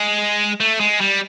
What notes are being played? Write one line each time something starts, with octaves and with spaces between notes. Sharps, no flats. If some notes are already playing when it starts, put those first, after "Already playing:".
Already playing: G#3
A3
G#3
G3